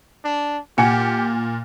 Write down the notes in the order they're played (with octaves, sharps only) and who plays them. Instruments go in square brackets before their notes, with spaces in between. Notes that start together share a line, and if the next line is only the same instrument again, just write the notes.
[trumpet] D4
[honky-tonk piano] A#2 [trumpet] G4 [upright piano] F#5 G#5 C#7